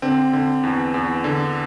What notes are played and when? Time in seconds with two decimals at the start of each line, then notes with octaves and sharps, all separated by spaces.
0.02 D3 C4
0.33 D3
0.63 E2
0.94 E2
1.24 D3